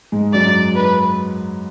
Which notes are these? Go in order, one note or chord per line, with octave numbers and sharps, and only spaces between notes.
G#2 G#3
F#2 F#3 D5
B4